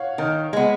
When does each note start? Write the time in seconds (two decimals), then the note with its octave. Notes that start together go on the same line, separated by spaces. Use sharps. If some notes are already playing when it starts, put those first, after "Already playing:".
Already playing: C#5 F5 F#5
0.18 D#3 A#4
0.53 G#3 B3